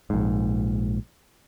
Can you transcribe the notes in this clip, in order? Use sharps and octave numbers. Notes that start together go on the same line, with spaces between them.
A#1 G#2